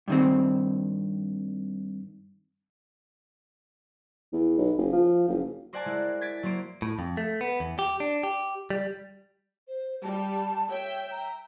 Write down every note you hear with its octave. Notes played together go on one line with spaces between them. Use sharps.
G2 D#3 C4
E2
B1
F#1
F3
F#1
A#4 C5 D5 F#5 G#5 A5
G#3 E4
G#6 A6 B6 D7
F#3 A#3 C5 D7
A2
F2
A3
B3
E2
G4
D4
G4
G3
C5
G3 A5
C#5 E5 G5
A#5